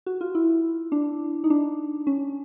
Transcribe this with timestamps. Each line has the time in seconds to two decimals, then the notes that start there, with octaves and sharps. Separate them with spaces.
0.06 F#4
0.21 F4
0.35 E4
0.92 D4
1.44 D#4
1.50 D4
2.07 C#4